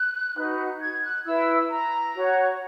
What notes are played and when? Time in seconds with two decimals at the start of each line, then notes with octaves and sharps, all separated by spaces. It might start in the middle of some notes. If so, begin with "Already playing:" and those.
Already playing: F#6
0.36 D#4 F#4 B4
0.81 G#6
1.03 F#6
1.26 E4 B4 E6
1.71 A#5
2.16 F#4 C#5